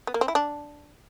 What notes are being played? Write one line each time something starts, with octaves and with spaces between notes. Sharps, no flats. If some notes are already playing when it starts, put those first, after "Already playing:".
B3
A#3
C4
E4
D4